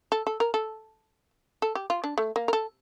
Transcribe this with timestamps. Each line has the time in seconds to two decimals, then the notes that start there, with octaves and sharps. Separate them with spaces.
0.12 A4
0.27 A4
0.40 A#4
0.54 A4
1.62 A4
1.75 G4
1.90 F4
2.04 D4
2.18 A3
2.36 A#3
2.48 A#4
2.53 A4